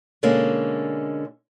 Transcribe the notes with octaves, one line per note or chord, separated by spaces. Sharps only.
B2 D3 G#3 A#3 C#4